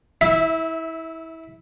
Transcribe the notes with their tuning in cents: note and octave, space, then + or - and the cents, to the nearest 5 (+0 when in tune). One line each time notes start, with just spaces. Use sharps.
E4 -25 E5 +0